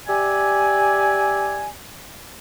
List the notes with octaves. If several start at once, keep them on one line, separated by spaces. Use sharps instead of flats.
G4 D5 E5 G#5